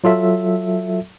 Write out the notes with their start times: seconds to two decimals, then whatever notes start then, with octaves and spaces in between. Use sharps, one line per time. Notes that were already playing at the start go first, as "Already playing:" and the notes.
0.04 F#3 F4 A4 E5